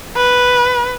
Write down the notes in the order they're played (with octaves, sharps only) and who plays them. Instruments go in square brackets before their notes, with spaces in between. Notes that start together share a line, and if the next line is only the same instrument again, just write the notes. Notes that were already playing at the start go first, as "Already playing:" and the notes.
[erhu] B4